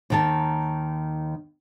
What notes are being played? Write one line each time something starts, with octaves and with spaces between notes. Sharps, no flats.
D#2 D#3 A5